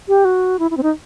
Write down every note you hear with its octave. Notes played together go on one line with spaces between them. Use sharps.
G4
F#4
E4
E4
C4
D#4